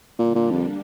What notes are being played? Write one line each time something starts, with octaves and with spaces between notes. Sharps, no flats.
A#2 D3 G3 A#3 D4
A#2
F2